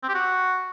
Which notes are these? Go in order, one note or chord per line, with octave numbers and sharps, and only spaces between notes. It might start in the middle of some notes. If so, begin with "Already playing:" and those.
C4
G4
F#4